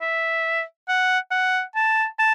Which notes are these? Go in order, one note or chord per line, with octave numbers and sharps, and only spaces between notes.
E5
F#5
F#5
A5
A5